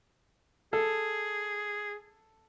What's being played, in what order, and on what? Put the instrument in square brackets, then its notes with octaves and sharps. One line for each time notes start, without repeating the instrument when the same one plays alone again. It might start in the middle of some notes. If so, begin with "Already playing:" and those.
[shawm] G#4 [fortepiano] A4